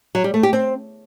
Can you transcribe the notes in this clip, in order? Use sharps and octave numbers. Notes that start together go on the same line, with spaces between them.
F#3
G3
A3
G4
C4